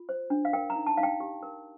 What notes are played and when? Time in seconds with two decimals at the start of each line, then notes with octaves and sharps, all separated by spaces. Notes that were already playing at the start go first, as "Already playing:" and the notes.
Already playing: F4
0.09 C5
0.30 D4
0.45 F5
0.53 A#4 G5
0.70 A#5
0.76 D#4
0.87 A5
0.97 D#4 F5
1.03 G5
1.20 G4
1.43 A#4